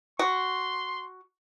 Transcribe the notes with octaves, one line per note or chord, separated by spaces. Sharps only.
F#4 C6